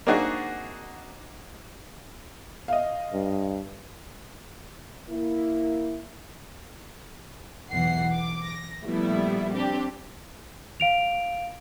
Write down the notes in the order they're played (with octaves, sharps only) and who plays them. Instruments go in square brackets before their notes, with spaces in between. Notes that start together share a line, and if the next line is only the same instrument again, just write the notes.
[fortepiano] A#3 C4 D4 D#4 F#4 G#4
[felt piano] D#5 F5
[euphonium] G2
[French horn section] A#3 E4
[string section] B1 E2 E3 F#5 C7
D6
A#6
A#2 F3 G3 A3 B3 E4
C4 D4 G4
[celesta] F5 D7 F7